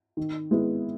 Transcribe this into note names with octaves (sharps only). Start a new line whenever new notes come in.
D#3
G#3 B3 E4